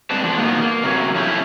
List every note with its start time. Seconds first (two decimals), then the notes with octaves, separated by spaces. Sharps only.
0.10 G3 G#3 C4 D4 B4 A5
0.24 E2 F3 D4
0.37 B2 D#3 A#3 B3
0.61 A#3
0.84 C3 F#3 C#4
1.15 F3 C#4 E4 G4